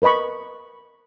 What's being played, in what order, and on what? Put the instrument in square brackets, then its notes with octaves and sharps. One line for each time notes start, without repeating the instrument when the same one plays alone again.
[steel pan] A#4 B4 D#5 B5 C#6